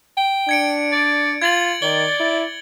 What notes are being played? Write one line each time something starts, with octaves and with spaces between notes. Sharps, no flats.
G5
D4 G#6 C#7 D7
D5
F4 G#6 A6 F#7
D#3 D5 G7
E4